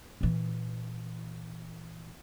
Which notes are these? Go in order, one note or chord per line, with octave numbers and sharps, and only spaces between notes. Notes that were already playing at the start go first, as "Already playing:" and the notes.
A#2 E3